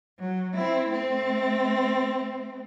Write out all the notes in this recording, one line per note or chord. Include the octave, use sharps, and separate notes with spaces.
F#3
C4 E4
A3 C4